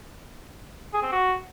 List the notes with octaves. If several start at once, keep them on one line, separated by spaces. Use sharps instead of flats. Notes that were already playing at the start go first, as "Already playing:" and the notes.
G#4
C4
F#4